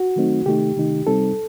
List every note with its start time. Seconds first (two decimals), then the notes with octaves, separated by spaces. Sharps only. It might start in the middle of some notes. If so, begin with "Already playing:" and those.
Already playing: F#4
0.16 D#3 F#3 A3 C4 D#4
0.46 C3 D#3 A3 D#4 G4
0.77 C3 D#3 A3 D#4
1.07 C3 G3 C4 D#4 A4